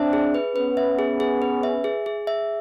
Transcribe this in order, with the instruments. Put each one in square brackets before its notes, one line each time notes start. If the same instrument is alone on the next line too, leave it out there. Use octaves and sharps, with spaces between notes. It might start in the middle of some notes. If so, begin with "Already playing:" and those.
Already playing: [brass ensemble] C4 D4 [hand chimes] E5
[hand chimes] G#4
B4
[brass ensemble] B3 C#4 [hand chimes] B4
[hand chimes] E5
G#4
G#4
B4
E5
G#4
G#4
E5